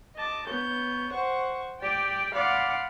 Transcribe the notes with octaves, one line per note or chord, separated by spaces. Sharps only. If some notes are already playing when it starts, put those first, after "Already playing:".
D#5 A5 D6
B3 C#5 G6
C5 F#5 C#6
G4 D5 G5
D5 F5 F#5 B5 C6 D6